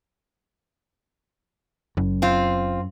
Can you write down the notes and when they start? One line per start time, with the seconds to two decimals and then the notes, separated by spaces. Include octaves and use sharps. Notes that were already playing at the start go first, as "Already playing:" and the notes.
1.97 F#1 F#2
2.22 C4 F4